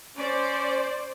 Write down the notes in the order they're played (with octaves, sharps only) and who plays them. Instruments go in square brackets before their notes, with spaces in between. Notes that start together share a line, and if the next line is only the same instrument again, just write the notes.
[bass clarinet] C#4 [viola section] C5 D5